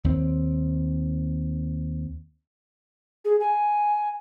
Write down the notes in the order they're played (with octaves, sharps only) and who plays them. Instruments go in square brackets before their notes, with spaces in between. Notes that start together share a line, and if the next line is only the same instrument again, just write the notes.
[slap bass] D#2 C4
[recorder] G#4
G#5